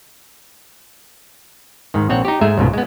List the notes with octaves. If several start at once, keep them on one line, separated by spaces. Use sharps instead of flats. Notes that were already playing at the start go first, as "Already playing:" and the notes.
G#2 D#3
A#1 C4 C#5 F#5
D#4 G4
G#2 G#3 A3 G#4 E5
C#2 G#2 B2
G#3 B3